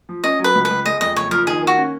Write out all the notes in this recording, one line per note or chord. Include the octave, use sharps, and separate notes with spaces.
F3
C#4 D#5
F#3 B4
C#2
B4
C#2
G#3 D#5
F2 D#5
F#1 C#5
F3 A#4
D#3 G#4
A#3
F#4
C#4